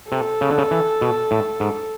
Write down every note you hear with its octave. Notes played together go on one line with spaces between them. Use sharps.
C3 A4
C#3
D3
C#3
E3
B2
A2
G#2